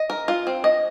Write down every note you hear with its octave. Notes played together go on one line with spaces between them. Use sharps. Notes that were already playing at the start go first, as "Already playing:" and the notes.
Already playing: D#5
A#4
F4
C4
D#5